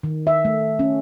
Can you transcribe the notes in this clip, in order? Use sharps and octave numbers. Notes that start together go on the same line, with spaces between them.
D#3
E5
A3
C#4